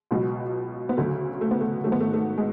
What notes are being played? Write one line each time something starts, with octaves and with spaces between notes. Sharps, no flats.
C#2 B2 F#3
B3
D2 C#3 F#3 A3
A3
B3
A3
G#1 G#2 F#3 A3
B3
A3
A3
G#3